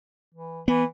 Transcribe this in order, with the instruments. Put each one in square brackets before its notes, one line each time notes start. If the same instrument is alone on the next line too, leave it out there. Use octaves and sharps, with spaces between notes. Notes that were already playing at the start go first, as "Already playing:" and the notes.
[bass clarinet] E3
[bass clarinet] E3 [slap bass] B3